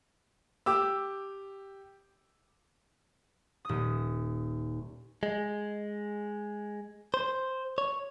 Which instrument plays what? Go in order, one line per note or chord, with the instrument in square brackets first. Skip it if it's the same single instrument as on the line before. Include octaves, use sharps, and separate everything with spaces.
[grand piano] G4 D6 E6
[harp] D#1 D#6
[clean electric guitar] G#3
C5
C#5